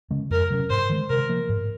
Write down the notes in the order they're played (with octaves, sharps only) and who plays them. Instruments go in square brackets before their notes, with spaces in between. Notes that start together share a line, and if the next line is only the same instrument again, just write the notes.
[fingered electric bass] C#3 G#3 C#4
[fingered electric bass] F2 [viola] A#4
[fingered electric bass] C3 F#3 C#4
[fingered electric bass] G#2 [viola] C5
[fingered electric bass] D#3 G#3
[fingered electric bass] C3 [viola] A#4
[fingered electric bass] F3 A#3
G#2